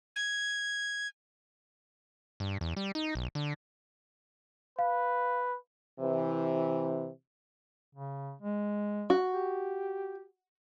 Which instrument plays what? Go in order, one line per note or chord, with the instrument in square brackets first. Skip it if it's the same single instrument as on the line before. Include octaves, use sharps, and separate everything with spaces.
[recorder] G#6
[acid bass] G2
E2
G3
D#4
B1
D3
[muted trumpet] B4 [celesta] F5
[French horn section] C3 E3
[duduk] C#3
G#3
[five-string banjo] F#4
[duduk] G4